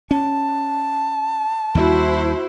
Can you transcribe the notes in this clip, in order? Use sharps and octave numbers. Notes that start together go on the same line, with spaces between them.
C#4 A5
D#2 G3 E4 F#4 C5